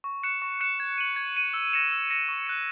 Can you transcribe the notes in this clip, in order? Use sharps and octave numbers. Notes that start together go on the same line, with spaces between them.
C#6
F#6 C#7 E7
C#6
F#6 C#7 E7
G#6
D#7 F#7
G#6
D#7 F#7
E6
A#6 C#7 E7
E6
A#6 C#7 E7
C#6
F#6 C#7